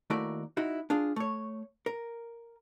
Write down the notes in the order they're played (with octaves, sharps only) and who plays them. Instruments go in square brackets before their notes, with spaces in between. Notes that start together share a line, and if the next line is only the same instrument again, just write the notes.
[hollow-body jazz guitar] D#2 A3 E4 F#4 A#4 D5
D#4 E4 F#4
D4 F4 G#4
A3 C#5
A#4